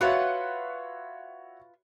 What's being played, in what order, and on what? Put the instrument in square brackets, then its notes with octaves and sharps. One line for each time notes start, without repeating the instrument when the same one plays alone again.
[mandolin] F4 B4 F#5 [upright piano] F#4 C#5 E5